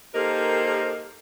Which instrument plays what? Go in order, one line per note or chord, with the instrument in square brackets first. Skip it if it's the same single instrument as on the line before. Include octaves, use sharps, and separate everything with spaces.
[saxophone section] A#3 D#4 A#4 [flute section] G4 A4 C5